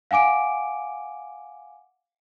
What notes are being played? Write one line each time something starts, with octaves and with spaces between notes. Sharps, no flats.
F5 F#5 G#5 D6 D7